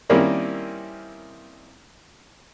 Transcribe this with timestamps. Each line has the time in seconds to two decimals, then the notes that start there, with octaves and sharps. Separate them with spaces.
0.10 D#3 G3 A#3 C4 C#4 E4